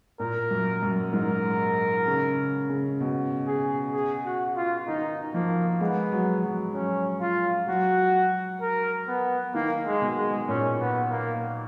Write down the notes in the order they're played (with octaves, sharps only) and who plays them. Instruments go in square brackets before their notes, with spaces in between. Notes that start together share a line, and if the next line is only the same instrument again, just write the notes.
[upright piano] A#2 [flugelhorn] A#4
[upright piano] F#2
F#2
[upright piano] G#2 [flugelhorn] A#4
[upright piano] C#3
C#3
B2
[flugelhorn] G#4
G#4
F#4
F4
[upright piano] D#3 [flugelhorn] D#4
[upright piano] F3 [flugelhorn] A#3
[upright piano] G#3 [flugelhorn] B3
[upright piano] F#3
F#3
[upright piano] F#3 [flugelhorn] C#4
[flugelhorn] F4
[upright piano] F#3 [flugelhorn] F#4
[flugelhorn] A#4
B3
[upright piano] D#3 [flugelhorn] A#3
[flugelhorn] G#3
[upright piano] B2
[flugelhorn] G#3
[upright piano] A#2 [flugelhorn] C#4
[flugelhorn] B3
A#3